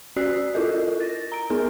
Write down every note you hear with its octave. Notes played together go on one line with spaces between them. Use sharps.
C#4 F#4 D5 E6 F#6 C7
E4 F4 A4 A#4 D#5
A6 A#6
A#5 D7
B3 D#4 G#4 A#4